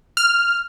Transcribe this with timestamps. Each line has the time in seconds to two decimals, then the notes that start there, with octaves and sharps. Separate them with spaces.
0.17 F6